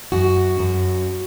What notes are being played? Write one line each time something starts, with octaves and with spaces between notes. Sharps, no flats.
F#2 F#4
F#2